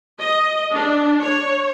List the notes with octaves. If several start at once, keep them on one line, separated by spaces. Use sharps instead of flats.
D#5
D4
C#5